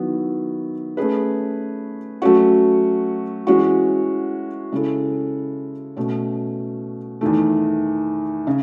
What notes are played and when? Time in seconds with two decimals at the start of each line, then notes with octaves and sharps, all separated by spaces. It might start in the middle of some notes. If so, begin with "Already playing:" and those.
Already playing: D#3 F#3 B3 E4
0.97 A3 C#4 G#4 B4
2.22 F#3 A3 C#4 F#4
3.47 E3 G#3 C#4 F#4
4.72 C#3 G#3 C#4 E4 A4
5.97 B2 A3 C#4
7.21 E2 D#3 A3
8.47 C#3